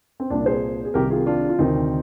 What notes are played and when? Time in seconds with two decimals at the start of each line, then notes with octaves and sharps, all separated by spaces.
0.20 C4
0.30 C2 A#2 D4
0.46 G#4 C5
0.85 G#4
0.94 C2 C3 D#3 G4 A#4
1.10 F4 G#4
1.26 D4 F4
1.49 F4
1.59 D2 C3 D#3 C4 D#4